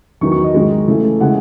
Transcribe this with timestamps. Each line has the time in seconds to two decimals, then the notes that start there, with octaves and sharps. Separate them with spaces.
0.21 E2 D#3 F#3 B3 C#6
0.32 C#6
0.43 D#5
0.54 G#2 D#3 G#3
0.88 C#3 E3 A3
1.20 C#3 E3 G#3 F#5